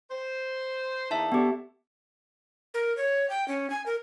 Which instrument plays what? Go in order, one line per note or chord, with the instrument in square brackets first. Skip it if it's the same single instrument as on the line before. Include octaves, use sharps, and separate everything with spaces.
[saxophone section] C5
[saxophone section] E2 A#3 D#4 [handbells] E5 A5
[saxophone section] D3 [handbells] B3 G4
[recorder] A#4
C#5
G5
C#4
G#5
A#4